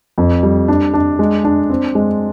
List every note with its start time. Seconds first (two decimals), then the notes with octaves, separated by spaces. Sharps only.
0.18 F2
0.43 G3
0.68 D4
0.94 D4
1.19 G#3
1.44 D4
1.70 C4
1.95 G#3